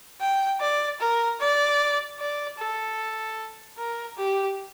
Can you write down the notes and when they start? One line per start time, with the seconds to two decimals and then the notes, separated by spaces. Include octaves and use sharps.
0.21 G5
0.61 D5
1.00 A#4
1.40 D5
2.19 D5
2.58 A4
3.78 A#4
4.17 G4